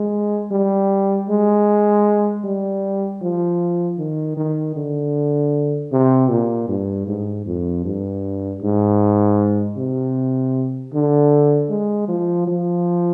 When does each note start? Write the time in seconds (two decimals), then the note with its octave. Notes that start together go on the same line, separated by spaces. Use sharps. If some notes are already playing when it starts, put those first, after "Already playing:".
Already playing: G#3
0.51 G3
1.29 G#3
2.44 G3
3.21 F3
3.98 D#3
4.37 D#3
4.76 D3
5.92 C3
6.30 A#2
6.68 G2
7.07 G#2
7.46 F2
7.85 G2
8.62 G#2
9.77 C3
10.93 D3
11.69 G#3
12.08 F3
12.47 F3